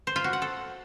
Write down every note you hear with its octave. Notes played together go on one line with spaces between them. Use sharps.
C5
F4
F#4
F#5
A4